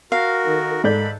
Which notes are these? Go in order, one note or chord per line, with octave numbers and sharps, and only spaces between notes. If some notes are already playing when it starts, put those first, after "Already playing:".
F#4 A#4 F5
D#3 A4
G#2 A4 D5 B5 G6